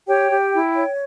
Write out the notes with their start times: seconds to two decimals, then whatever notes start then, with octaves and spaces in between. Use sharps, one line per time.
0.07 G4 C#5 G5
0.31 G4
0.53 E4
0.77 C#5